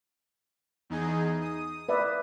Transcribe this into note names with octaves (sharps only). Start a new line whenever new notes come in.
E2 D#4 G#4
D#6
B4 D5 E5